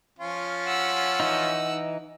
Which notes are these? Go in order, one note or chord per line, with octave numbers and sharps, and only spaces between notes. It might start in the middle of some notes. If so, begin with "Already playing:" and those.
F3 C#4 F4
F#5 E6
E3 D#4